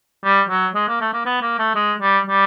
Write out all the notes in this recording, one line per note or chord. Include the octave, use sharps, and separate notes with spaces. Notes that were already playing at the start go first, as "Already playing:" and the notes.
G3
F#3
G#3
A#3
A3
A#3
B3
A#3
A3
G#3
G3
G3